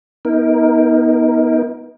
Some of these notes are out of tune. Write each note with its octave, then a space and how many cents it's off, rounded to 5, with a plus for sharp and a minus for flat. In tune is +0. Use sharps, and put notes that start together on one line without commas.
B3 -15 D#4 +35 A#4 +0